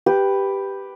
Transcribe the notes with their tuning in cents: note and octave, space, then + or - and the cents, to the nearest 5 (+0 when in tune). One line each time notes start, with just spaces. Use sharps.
G4 +0 B4 +0